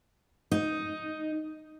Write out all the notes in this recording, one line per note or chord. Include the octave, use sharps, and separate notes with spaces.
D#4